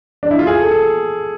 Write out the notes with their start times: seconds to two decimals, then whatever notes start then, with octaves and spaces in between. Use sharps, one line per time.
0.23 D4
0.31 E4
0.39 F4
0.47 G#4
0.59 A4
0.71 A4